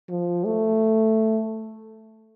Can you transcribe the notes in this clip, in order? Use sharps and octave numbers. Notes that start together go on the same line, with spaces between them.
F3
A3